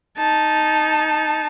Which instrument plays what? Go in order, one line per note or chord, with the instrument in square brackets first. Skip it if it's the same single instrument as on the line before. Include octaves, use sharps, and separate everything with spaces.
[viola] D#4 A5